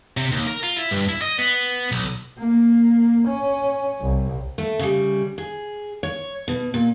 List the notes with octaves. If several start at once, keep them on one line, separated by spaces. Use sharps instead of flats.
C3
D#2
A#4
F4
E4
G2
E4
D#5
B3
B1
A#3
C#4
C2
A3
C#3 G3
G#4
C#5
B2
A#2